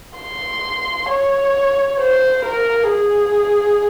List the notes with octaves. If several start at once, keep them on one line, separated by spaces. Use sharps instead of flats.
C6
C#5
C5
A#4
G#4